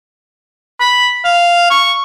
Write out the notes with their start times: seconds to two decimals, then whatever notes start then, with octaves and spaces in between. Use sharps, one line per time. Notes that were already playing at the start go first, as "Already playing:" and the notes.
0.80 B5
1.24 F5
1.70 C#6